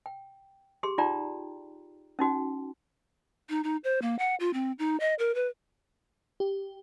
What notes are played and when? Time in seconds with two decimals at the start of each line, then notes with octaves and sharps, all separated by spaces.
0.06 G5
0.83 G4 G#4 C6
0.98 D#4 F4 D5 G5 A#5
2.19 C#4 D#4 F#4 G5
3.49 D#4
3.64 D#4
3.84 C5
4.02 A#3
4.19 F#5
4.40 F4
4.53 C4
4.79 D#4
5.00 D#5
5.19 A#4
5.35 B4
6.40 G4